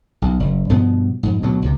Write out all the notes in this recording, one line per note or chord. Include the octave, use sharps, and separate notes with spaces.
B1
F#1
G2 B2 F3 B3
F2 G#2
D2 B2 F#3
C#2 C3